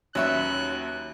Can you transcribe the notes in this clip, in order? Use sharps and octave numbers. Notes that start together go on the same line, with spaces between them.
D#2 F#3 C#4 B4 E5 C#6 F#6